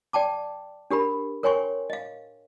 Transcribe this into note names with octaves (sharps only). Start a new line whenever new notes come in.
D5 G5 A5 D6
D4 G4 A#4 B5
A#4 C#5 G5 G#5 C6 C#6
D#5 F5